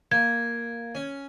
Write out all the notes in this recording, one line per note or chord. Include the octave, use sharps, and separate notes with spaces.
A#3 G#6
C#4